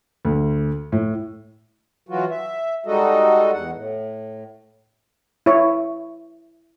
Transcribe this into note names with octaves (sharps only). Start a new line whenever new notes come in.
D2
A2
E3 F#3 F4 F#4
E5
G3 G#3 D#4 F#4 A4 D#5
E2 F#5
A2
E4 C#5